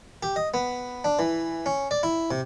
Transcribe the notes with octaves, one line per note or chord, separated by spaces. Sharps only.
G4
D#5
B3
D4
E3
C#4
D5
E4
C3